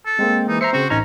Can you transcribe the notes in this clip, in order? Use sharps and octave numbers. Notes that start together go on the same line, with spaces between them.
A4
G#3 A#3 C4
E3 D#4
C5 E5 A#5 C7 C#7
C#3 C4 F#4
A1 C#4 D#4 A#5